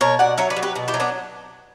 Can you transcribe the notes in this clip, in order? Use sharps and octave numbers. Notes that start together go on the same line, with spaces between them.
B2 A#4 C#5
B2 D5 F#5
F#3 C#5 E5
B4 D5
F#3
G4 B4
B2
E4 G4
F#3
B3 D4